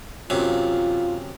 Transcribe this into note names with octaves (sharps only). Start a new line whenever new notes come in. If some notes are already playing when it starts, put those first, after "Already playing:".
F#2 C3 F4